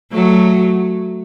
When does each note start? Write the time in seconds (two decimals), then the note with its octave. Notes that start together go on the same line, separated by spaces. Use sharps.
0.12 F#3 A3